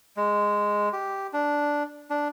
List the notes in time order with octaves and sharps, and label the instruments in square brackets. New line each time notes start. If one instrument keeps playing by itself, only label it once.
[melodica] G#3
G4
D4
D4